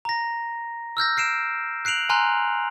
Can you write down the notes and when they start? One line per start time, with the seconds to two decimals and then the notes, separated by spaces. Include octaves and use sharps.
0.05 A#5 A#6
0.97 E6 F6 G6 A#6
1.17 F6 C7 D7 E7
1.85 F#6 C7 D7 F7 F#7
2.09 G#5 A#5 C6 F6 F#6